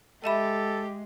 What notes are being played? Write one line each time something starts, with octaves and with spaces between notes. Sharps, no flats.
G#3 G4 A4 D#5 E5 B5